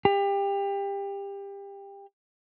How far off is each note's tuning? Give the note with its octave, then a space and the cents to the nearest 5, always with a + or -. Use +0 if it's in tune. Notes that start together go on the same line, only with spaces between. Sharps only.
G4 +25